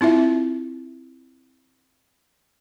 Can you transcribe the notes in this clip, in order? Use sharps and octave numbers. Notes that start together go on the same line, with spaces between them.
C4 E4 F4 E5